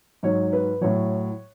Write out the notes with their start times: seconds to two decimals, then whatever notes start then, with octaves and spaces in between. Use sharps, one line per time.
0.23 G#2 F#3 C#5
0.53 B4
0.81 A2 F#3 C#5